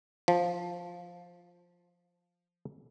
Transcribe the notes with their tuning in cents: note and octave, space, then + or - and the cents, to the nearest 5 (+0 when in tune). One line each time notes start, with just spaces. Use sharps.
F3 +5